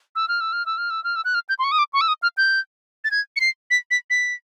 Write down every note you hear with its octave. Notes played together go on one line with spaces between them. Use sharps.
E6
F6
E6
F6
E6
F6
E6
F6
E6
F#6
F6
G6
C6
C#6
D#6
D6
C#6
E6
D#6
F6
G6
A6
G#6
C#7
C7
B6
B6
B6